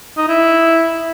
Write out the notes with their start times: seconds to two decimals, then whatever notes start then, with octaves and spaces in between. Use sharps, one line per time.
0.17 D#4
0.28 E4